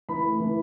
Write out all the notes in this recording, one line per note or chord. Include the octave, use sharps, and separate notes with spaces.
E3 B5
A3
E3